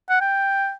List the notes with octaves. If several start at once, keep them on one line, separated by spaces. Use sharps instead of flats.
F#5
G5